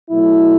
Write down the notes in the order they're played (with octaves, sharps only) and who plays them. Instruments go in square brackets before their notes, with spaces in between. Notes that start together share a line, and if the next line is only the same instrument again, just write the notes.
[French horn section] B2 F#3 A3 E4